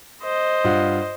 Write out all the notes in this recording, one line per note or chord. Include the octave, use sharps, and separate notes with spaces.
C5 D#5
G2 F4 F#5